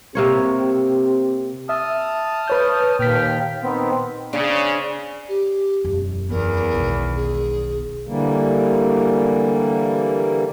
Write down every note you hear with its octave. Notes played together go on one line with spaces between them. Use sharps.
C3 A#3 C4 G4 C#5
E5 A5 D#6 F6
B4 C#5 G6
D#2 A#2 G5 F6 B6
D#3 B3 C4
C#3 C4 D4
G4
E1 F#2
E2 C4 A#4
E1 B1 B2 D#3
G#4
D3 E3 G3 A#3